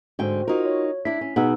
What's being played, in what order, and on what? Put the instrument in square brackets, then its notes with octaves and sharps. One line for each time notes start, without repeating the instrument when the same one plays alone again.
[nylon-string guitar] G#2 D3 G5 [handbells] F#4 C5
[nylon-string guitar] D#4 A#4 [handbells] F4 F#4
[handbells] C#5
[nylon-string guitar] D4 E4 [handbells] B6
[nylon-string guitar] C#4
[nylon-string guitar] B2 G#4 F#5 [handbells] B3 D#4 E6